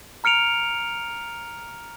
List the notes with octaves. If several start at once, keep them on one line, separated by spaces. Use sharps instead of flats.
A#5 F6 C#7 D7 F7